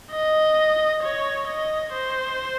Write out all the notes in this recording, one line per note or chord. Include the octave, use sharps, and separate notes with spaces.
D#5
C#5
D#5
C5